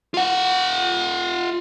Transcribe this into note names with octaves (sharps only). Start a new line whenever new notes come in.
F4 F#5